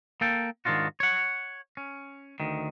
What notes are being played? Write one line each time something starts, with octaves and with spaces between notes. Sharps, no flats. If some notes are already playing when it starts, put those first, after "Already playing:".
A#3 A4 G5
G#2 D#3 F3 D4 F4 F#4
C#5 F#5
C#4
D2 D#3